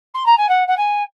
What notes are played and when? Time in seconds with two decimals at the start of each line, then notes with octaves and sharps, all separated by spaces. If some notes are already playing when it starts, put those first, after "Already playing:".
0.14 C6
0.26 A#5
0.37 G#5
0.49 F#5
0.67 F#5
0.77 G#5